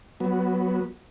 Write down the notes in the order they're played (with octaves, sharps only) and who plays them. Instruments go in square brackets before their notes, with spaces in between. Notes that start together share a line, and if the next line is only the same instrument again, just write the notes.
[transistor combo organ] F#3 B3